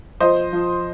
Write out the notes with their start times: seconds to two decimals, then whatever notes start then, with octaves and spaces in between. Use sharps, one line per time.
0.20 F3 C5 D#5
0.52 F3